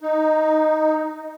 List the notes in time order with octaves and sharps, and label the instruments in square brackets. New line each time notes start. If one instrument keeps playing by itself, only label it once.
[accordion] D#4